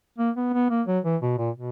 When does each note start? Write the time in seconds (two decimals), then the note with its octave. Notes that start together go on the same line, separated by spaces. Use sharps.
0.18 A#3
0.36 B3
0.53 B3
0.70 A#3
0.87 F#3
1.04 E3
1.21 B2
1.38 A#2
1.55 B2